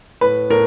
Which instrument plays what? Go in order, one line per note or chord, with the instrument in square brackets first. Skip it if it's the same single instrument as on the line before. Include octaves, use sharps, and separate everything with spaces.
[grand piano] A2 B4
A2 A#4